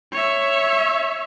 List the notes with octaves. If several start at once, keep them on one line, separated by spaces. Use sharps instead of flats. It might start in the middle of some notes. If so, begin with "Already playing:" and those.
C#5 E5